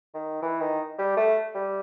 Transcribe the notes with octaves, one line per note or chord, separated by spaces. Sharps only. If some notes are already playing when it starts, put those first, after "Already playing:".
D#3
E3
D#3
G3
A3
G3